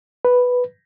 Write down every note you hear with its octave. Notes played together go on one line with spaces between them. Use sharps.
B4